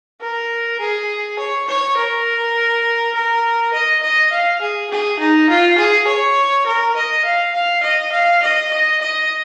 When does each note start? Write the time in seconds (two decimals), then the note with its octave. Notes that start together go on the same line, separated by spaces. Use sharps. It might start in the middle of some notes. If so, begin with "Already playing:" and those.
0.21 A#4
0.80 G#4
1.39 C#5
1.68 C#5
1.97 A#4
3.15 A#4
3.73 D#5
4.03 D#5
4.32 F5
4.61 G#4
4.90 G#4
5.19 D#4
5.49 F4
5.78 G#4
6.07 C#5
6.66 A#4
6.96 D#5
7.25 F5
7.54 F5
7.83 D#5
8.12 F5
8.42 D#5
8.71 D#5
9.01 D#5